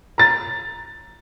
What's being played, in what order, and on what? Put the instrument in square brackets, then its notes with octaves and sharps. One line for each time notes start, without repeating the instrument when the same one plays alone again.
[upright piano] A#5 A6